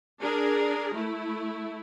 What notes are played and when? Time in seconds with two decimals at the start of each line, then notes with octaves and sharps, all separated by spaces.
0.20 D4 G#4 A#4
0.93 A3 E4